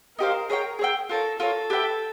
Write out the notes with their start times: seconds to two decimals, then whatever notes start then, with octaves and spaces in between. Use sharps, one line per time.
0.19 D#4 G4 A#4 C5 F5
0.49 G#4 C#5 E5 G5
0.79 G#4 C#5 E5 G5
1.09 F4 A4 A#4 C#5
1.40 F4 A4 A#4 C#5
1.70 G4 B4 E5 G5